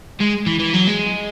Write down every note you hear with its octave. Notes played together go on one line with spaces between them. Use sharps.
G#3
E3
E3
F#3
G#3